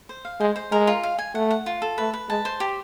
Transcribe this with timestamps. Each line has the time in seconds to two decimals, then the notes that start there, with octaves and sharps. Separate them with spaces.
0.09 C5
0.25 F5
0.40 G#3 C5
0.56 C5
0.71 G#3 A#4
0.87 F4
1.03 F5
1.19 G#5
1.35 A3 F#5
1.51 F#5
1.66 F4
1.82 A4
1.98 A3 B4
2.13 B4
2.29 G#3 A5
2.45 C5
2.60 G4